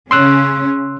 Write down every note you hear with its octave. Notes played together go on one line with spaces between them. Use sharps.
C#3 C#4 C6 E6 F#6